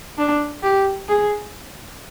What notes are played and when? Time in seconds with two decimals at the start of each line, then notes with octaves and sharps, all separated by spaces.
0.18 D4
0.63 G4
1.09 G#4